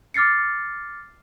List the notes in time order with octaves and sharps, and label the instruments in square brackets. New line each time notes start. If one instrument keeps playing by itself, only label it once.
[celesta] D6 F6 A6 C7 C#7